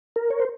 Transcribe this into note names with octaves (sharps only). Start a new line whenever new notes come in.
A#4
C#5
C5